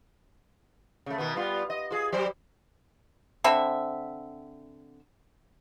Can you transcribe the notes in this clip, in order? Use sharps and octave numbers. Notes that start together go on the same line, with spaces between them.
C#3 A3
B2 D#3 B3
G3 B3 F4
D#5
F4 G#4
F#3 G3 C5
D3 C4 E5 B5